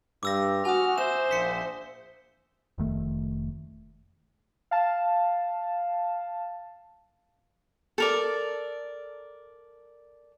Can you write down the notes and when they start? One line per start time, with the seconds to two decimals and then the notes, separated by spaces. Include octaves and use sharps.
0.23 G2 D6 E6 A#6
0.65 F#4 G#5 D#6 F6
0.98 C5 E5 E7
1.31 A#1 B6 C#7
2.78 F1 D#3 A3
4.71 F5 A5
7.98 A4 A#4 D5